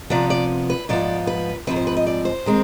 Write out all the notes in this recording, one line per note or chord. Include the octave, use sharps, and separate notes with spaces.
C3 F3 B3 D5
D5
B4
G#2 F3 B3 D5
B4
G#2 F3 C4 B4
C5
B4
D#5
D5
C5
D#3 G#3 C4